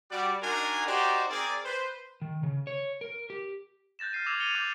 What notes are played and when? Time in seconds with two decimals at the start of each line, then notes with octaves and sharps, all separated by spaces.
0.11 G3 F#4 D5
0.43 D4 D#4 F#4 A#4 G#5 C6
0.87 D#4 F#4 G4 C5 D5
1.30 C4 G#4 A#4 D5
1.65 B4 C5
2.22 D#3
2.43 C#3
2.67 C#5
3.01 A#4
3.30 G4
3.99 F#6 G6 A6 A#6 E7
4.13 F6 A6 C7 D#7
4.26 D6 E6 G#6 A#6 E7 F7
4.40 A6 C#7 D#7 F7 G7
4.55 D6 F#6 G6